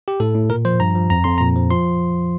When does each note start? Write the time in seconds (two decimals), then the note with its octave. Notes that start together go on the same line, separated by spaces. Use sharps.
0.08 G4
0.20 A2 A4
0.35 A2
0.50 A#2 A#4
0.65 F3 C5
0.80 G2 A#5
0.95 F3
1.10 F2 A#5
1.24 F2 C6
1.38 A#2 A#5
1.56 F3
1.70 F3 C6